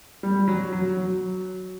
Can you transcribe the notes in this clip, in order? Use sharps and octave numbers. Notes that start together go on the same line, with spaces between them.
G3
F#3
F#3
F#3